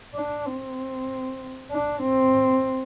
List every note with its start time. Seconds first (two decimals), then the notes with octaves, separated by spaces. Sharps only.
0.15 D4
0.46 C4
1.71 D4
2.02 C4